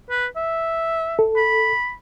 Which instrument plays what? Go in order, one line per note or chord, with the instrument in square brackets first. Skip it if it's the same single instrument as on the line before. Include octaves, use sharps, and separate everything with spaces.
[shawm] B4
E5
[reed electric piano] A4
[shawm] B5